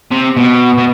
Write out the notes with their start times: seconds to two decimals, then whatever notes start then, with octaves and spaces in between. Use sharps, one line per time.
0.12 C3
0.37 B2
0.78 B2